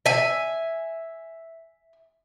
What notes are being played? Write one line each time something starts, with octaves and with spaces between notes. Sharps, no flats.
E5 G#5